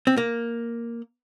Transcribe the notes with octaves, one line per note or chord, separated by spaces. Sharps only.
C4
A#3